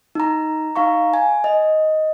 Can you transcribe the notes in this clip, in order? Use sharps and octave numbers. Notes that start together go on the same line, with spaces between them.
D#4 A#5
D#4 F5 A#5 C#6
G#5
D#5